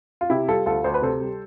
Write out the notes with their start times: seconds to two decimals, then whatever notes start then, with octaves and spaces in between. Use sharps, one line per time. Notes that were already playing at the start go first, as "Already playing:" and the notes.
0.21 F4
0.30 C3 E4 G4
0.48 G3 F4 A4
0.66 D2 F4 A4
0.84 D2 C5
0.94 B4
1.02 C3 A4 C5
1.21 G3